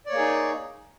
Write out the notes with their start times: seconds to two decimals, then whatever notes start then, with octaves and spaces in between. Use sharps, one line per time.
0.06 D5
0.09 C#5
0.13 A#3
0.16 G#4
0.19 D#4